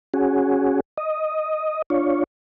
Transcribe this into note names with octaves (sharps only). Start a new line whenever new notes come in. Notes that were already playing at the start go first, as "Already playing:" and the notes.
C#4 F#4 G#4
D#5
D4 F4 C#5